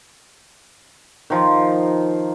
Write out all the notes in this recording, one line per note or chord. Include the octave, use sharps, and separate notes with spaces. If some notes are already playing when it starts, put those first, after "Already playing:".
D#3 F3